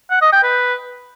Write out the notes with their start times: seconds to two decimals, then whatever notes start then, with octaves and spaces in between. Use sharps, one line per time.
0.11 F#5
0.21 D#5
0.32 G5
0.43 B4